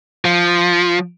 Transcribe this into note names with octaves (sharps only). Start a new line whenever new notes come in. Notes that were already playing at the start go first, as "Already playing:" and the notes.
F3